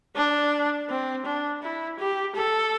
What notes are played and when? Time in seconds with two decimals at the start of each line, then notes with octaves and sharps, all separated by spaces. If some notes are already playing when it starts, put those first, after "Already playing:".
0.16 D4
0.90 C4
1.25 D4
1.63 E4
1.99 G4
2.35 A4